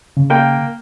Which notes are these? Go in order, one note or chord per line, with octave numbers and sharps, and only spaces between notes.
C#3
A#3 G5